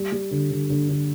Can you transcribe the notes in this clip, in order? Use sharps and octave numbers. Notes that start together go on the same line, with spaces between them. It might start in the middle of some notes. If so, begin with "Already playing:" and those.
Already playing: G3
G3
D3
D3
D3
D3